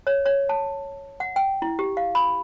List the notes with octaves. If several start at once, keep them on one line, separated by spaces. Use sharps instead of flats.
C#5
C#5
A5
F#5
G5
E4
G4
F5
B5